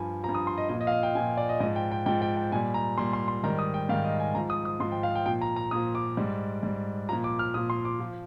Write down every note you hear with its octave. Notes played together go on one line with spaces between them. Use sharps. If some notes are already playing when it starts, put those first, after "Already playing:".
Already playing: G2 F3 G#5
F3 A#5
G2
D#6
C6
D#5
A#2 F3 D#5
D#5
F5
D#5
G5
A#2 F3 G#5
D5
D#5
G#2 F3 D#5
G5
G5
G#2 F3 G5
G5
G5
A#2 G3 G#5
A#5
A#2 G3 C6
C6
C6
G#2 D#3 G3 A#5
D#6
G5
G#2 D#3 G3 F5
D#5
G#5
G#2 F3 A#5
D#6
D#6
G#2 F3 C6
G5
F5
G5
A#2 F3 G5
A#5
A#5
A#2 F3 D#6
D6
G#2 G3
G#2 G3
A#2 F3 A#5
D6
F6
A#2 F3 D#6
C6
D6
F3